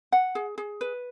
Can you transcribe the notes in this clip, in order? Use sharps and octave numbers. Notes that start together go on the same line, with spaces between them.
F#5
G#4
G#4
B4